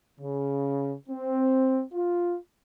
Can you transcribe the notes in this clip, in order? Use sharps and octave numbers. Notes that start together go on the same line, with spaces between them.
C#3
C4
F4